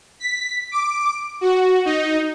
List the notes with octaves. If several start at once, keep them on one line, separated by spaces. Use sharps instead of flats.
B6
D6
F#4
D#4